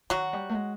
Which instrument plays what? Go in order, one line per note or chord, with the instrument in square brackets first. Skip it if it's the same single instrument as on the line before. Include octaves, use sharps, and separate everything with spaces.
[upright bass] D#3 [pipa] F#3 F#4
[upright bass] G3
A3
G#3